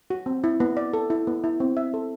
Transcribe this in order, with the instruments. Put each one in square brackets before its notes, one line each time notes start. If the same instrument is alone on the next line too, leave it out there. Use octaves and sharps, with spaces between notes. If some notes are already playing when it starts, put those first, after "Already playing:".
[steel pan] F#4
C4
E4
B3
D5
A4
E4
B3
E4
C4
E5
A4